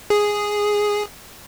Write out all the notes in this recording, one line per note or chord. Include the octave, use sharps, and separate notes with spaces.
G#4